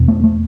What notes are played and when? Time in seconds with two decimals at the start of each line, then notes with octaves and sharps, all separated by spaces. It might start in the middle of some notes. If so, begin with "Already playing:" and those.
Already playing: E2 B2
0.08 A3
0.24 A3